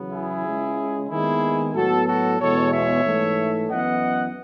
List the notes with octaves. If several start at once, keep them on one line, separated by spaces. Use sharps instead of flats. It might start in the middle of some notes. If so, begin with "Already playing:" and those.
Already playing: E2 C#3 F#3 B3
E4 G#4
C#2 C#3 G#3
D#2 D#3 G#3 B3 E4 G#4
A2 F#3 B3 F#4 A4
F#4 A4
E2 B2 G#3 A4 C#5
C#5 E5
G#2 E3 A3
F#2 E3 B3 D#5 F#5